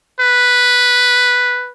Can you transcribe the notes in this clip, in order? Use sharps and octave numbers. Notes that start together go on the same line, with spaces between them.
B4